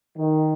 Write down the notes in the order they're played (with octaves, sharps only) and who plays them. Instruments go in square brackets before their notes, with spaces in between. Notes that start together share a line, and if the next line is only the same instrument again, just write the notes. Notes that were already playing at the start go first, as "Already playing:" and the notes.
[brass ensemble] D#3